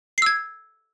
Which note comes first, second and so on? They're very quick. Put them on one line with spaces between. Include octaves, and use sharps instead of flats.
C7 E6 G#6